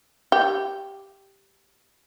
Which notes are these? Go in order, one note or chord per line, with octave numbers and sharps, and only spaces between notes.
G4